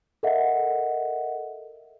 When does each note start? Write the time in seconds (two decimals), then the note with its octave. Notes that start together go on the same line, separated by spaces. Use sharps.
0.23 A4 A#4 D#5 E5 F#5